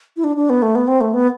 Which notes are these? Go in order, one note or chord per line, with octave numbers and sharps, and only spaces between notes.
E4
D4
D4
B3
A3
B3
C4
A3
B3